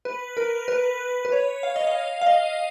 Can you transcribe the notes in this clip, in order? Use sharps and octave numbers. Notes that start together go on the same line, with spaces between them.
B4
A#4
B4
B4
C#5
F5
D#5
F5
F5
D#5